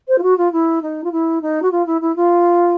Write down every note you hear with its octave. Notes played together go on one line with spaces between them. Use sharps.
C5
F4
F#4
F4
E4
D#4
F4
E4
D#4
F#4
F4
E4
E4
F4